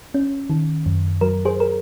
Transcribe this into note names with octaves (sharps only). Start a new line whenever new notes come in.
C#4
D#3
F#2
F#3 A#4
G#4 C5
A#4